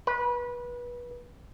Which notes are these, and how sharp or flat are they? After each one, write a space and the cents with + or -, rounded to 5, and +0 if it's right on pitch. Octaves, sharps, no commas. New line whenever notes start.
B4 -25